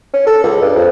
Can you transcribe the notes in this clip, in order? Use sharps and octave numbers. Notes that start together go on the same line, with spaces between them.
C#4
A4
C#2
G2
F2